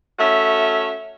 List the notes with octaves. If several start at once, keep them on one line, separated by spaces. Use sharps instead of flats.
A3 C#4 F#4 E5